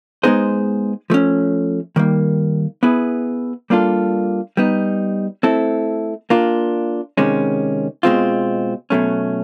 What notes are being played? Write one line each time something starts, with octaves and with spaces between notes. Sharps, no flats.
G#3 B3 D#4 G#4 C5
F3 A3 C#4
D#3 G3 A#3
B3 E4 G#4 B4
G3 A#3 D4 F4 A4
G3 B3 D#4
A3 C4 E4 A4
A#3 D4 F4
C3 D#3 G#3 C#4
B2 G#3 C4 F4
B2 F#3 A3 C#4